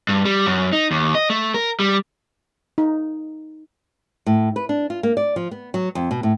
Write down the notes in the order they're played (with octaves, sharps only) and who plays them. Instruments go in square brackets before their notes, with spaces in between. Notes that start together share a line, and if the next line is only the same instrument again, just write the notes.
[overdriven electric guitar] G2
G3
F#2
D#4
D#2
D#5
A3
A#4
G3
[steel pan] D#4
[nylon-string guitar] A2
B4
D4
F4
A#3
D5
F3
B3
F#3
F2
B2
A2